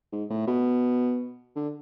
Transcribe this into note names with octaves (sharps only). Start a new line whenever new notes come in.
G#2
A2
B2
D3